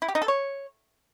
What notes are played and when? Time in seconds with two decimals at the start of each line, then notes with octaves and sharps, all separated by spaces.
0.02 E4
0.08 G4
0.15 D#4
0.22 A4
0.28 C#5